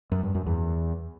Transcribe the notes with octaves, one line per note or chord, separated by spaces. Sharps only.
F#2
G2
F#2
E2